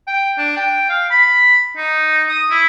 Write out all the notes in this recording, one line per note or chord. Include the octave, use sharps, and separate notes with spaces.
G5
D4
G5
F5
B5
D#4
D#6
E4